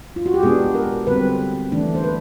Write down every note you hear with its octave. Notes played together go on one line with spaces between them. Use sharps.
F4
F#4
G4
B2 G#3 B3 D4 G#4
A#4
D3 G3 C4 B4
E3 A3 D4
C5
B4